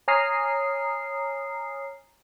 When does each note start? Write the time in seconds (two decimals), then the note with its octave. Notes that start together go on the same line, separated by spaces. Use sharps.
0.08 C#5 G#5 A#5 D#6 F6 C7